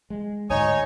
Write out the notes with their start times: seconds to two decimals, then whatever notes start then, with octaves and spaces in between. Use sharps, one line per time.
0.10 G#3
0.50 D2 G#2 D#4 C#5 G#5